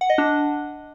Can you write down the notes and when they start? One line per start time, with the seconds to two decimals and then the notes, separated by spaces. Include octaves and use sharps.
0.01 F#5
0.10 D#5
0.18 D4